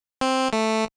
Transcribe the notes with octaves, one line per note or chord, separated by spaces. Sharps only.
C4
A3